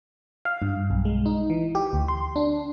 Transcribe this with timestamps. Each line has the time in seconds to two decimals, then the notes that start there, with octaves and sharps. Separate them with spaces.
0.45 F5
0.62 G2
0.90 B1
1.05 G#3
1.26 D#4
1.50 E3
1.75 G4
1.93 D2
2.08 C6
2.36 D4